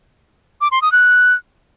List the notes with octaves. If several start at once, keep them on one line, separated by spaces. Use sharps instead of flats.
D6
C6
D#6
F#6